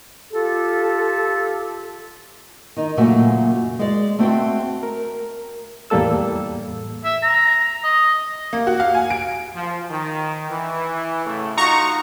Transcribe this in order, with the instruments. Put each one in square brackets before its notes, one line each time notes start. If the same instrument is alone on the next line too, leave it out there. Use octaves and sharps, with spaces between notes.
[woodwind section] F4 G4 A4
[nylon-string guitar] D#3 D#4
F#2 A#2 C#3 A3 C#4 F#4
G#3 D5
A3 C4 F#4 G5
[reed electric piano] A#4
E2 A2 G3 A#3 A4 E6
[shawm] E5
A#5
D#5
[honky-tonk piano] A#3
F#4
F5
G#5
D7
[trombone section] F3
D#3
E3
A2 C#3 A3
[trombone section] D#4 F4 F#4 [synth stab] A#5 C#6